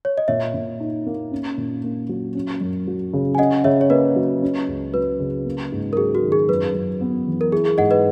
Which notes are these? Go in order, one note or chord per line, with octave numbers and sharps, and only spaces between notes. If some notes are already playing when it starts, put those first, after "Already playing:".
C#5
D#5
A#2 C#5 E5
A#2
D#4
A#3
C#4
A#2
A#3
F#3
C#4
F#2
F#3
C#3
G#5
C#4 D#5 F#5
C#3 C#5 E5
C#5
A#3 B4 D#5
F#3
C#4
C#2
F#3 B4
C#3
A#3
G#2
A#4
F#3 G#4
F#4
D#3
G#4
F#2 B4
F#2
B3
E3
A#4
E4 G#4
G#4
G#2 D#5 F#5
B4 D#5